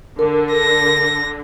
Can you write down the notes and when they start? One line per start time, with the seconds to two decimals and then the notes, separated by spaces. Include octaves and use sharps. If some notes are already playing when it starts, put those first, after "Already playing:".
0.19 D3 A#4
0.53 A#6